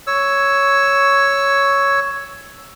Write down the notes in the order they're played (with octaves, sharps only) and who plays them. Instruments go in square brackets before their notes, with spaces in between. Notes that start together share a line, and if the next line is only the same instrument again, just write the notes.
[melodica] C#5 E6